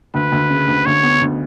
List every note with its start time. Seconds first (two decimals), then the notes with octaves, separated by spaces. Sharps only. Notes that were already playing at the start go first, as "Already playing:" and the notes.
0.14 D2 B4
0.32 D2
0.50 C#3
0.68 D2
0.86 D2 C#5
1.03 B3
1.21 D2